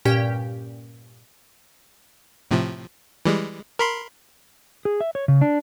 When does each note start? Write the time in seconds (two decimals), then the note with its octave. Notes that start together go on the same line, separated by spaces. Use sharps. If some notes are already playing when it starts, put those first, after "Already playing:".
0.05 G2 A#2 C#4 G4 G5
2.51 A2 C3 F3
3.25 E3 G3 G#3
3.79 A#4 B5 C6
4.85 G#4
5.01 E5
5.15 C#5
5.28 C#3
5.41 D4